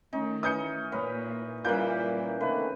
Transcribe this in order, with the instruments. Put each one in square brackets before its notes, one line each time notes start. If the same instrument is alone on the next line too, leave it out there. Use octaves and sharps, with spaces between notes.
[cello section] D#3 A3 [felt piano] C#4 [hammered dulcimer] D#4
[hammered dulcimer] E3 C#4 D#4 [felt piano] D#6 G6 C#7
[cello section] A#2 [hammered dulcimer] A#4 B4 [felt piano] C#5
[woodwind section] A#2 [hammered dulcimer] C#3 E3 A#3 [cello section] G3 E4 [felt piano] F#6 G6
[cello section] C3 [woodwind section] D#3 A3 A#3 [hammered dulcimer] B4